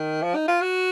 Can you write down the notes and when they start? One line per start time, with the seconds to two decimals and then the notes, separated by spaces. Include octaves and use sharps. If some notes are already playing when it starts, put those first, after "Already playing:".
Already playing: D#3
0.23 F3
0.35 D#4
0.48 F4
0.62 F#4